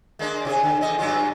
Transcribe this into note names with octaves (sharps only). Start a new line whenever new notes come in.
G#3 A#3 D4
C3 F#4 G#4
D3
E2 D3 D#5
G2 F#3 F4